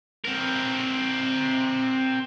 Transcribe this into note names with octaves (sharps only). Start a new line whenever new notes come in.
C4 A#4